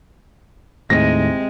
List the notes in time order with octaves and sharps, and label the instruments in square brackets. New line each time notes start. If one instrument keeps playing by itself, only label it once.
[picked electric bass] D#2 A2 [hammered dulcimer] C3 [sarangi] G#3 [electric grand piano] A#6